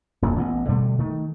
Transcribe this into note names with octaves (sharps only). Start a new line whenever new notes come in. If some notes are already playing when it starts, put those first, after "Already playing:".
D#1 A#1 F#2
A1 B3
B2 D3 G3 A3
D#3 A3